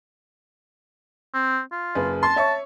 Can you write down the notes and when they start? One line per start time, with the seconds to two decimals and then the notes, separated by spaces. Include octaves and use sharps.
1.34 C4
1.72 F4
1.95 F#1 G#4 B4
2.23 A5 C6
2.36 C#5 E5 C#6